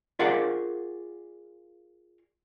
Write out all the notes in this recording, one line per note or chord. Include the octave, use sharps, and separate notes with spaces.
F4 G#4 A#4 D5 F5 F#5